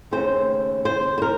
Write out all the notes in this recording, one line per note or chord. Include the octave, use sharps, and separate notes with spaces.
D#2 C#3 A3 C4 C5
C5
C5
A#4